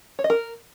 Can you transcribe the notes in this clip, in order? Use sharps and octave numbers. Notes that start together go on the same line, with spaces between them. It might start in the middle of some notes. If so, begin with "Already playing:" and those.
C#5
D#5
A#4